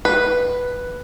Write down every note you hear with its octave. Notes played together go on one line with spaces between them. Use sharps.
B4